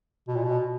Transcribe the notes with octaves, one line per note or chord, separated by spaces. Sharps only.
B2
A#2
B2